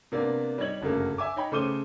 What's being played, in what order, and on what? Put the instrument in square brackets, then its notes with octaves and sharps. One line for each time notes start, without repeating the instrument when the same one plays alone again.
[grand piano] C3 A#3 B3 D4
G3 D#4 C#5 G#6 F#7
G1 F#2 C#3 A3 A#3
E5 G#5 D6
D#4 C#5 G5 B5
C#3 A3 C5 D6 D#7 G7